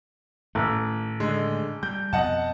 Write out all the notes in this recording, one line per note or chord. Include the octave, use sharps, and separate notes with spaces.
A1 A2 D#3 A3
D3 G#3
G3 G6
F2 B2 D#5 F#5 A5